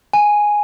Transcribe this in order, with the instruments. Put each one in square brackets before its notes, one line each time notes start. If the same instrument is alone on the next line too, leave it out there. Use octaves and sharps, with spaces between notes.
[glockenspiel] G#5